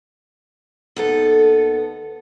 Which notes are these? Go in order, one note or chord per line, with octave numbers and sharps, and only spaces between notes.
D#2 B3 A4